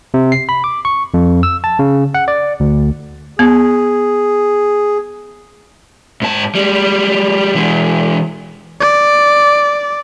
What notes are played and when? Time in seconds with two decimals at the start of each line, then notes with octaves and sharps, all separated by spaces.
0.14 C3
0.32 C7
0.49 B5
0.64 D6
0.85 C#6
1.14 F2
1.43 E6
1.64 A5
1.79 C#3
2.14 F#5
2.28 D5
2.60 D2
3.39 B3 G#4
6.22 G#2 A5
6.55 G3 G#3
7.55 E3 G#3
8.80 D5